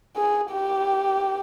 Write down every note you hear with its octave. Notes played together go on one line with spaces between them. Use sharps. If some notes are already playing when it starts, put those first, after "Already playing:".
G#4
G4